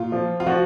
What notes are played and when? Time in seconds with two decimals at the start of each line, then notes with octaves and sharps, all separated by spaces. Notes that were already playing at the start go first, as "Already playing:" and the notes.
Already playing: A#2 F4
0.12 F3
0.40 F4
0.46 F3 F#4